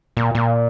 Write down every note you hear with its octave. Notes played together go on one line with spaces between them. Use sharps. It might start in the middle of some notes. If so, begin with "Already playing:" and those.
A#2
A#2